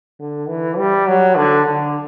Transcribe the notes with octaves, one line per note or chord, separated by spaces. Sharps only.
D3
E3
G3
F#3
D3
D3